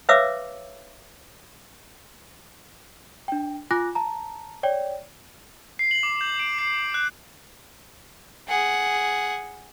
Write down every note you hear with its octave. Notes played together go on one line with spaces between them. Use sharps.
B4 C#5 E5 F5 D6 E6
D4 G5
F4 G#5 D6 F#6 A#6
A5 A#5
C#5 D5 G5
C7
F#7
D6
G6
D7
C7
F#6
G#4 F#5